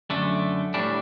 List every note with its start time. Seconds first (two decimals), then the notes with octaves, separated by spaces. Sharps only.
0.10 F#2 D3 A3
0.74 A2 G3 D4